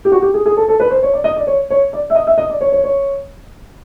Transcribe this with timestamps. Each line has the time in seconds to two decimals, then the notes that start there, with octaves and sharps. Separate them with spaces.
0.05 G4
0.12 F#4
0.22 G4
0.34 G#4
0.46 G#4
0.57 A4
0.68 A4
0.80 B4
0.91 C5
1.03 C#5
1.13 D5
1.24 D#5
1.36 D5
1.47 C#5
1.70 C#5
1.93 D5
2.10 E5
2.15 D#5
2.27 E5
2.38 D#5
2.50 D5
2.61 C#5
2.72 C#5
2.84 C#5